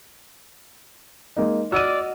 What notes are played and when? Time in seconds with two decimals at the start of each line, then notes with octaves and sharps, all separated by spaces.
1.37 G#3 A#3 D#4
1.72 F#4 D5 D#5 E6 F6 D#7